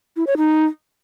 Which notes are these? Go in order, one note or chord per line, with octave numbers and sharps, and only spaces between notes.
E4
C#5
D#4